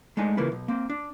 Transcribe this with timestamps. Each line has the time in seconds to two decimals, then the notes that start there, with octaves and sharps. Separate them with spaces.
0.17 G#3 A3 D4 D#4 G#5
0.37 C#3 E3 A#3 F4 B4
0.52 B1
0.68 A#3 C4
0.90 D4